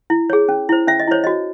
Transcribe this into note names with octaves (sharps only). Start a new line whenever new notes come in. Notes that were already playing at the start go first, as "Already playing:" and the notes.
E4
G#4 C#5
C#4
E4 C5
C#4 E5
D#5
E4 C5 C#5
F#4 D#5